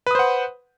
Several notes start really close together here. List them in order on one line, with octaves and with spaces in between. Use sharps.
B4 D#6 C5 F#5